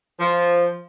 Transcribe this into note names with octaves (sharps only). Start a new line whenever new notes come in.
F3